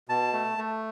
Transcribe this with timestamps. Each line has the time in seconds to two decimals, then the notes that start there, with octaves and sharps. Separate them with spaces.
0.09 B2 A5
0.33 A3
0.58 A3